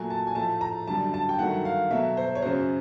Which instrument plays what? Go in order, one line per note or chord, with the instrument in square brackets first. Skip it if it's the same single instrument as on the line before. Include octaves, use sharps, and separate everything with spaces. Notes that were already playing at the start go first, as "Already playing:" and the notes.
Already playing: [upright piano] A#2 F#3 A3 G#5
A5
G#5
A2 F3 A3 A5
A#5
F#2 D3 G3 A5
A5
G5
G2 D#3 F#3 A3 F#5
F5
B2 F#3 A3 E5
C5
C#5
F#2 C#3 F#3 C5